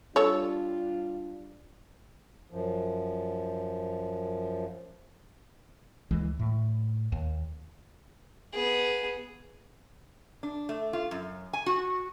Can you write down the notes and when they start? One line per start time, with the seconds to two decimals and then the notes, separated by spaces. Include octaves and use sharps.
0.16 G3 D4 F4 A4 C#5
2.51 F#2 F3
6.11 D2 E3 G#3
6.39 A2
7.12 D#2
8.54 B3 G#4
10.43 D4
10.69 A3
10.93 F4
11.11 F#2
11.53 G#5
11.66 F#4